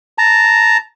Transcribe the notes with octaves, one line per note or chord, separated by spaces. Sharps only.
A5 A#5